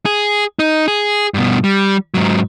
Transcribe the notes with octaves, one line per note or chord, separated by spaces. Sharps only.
G#4
D#4
G#4
G2 B2
G3
G#2 F#3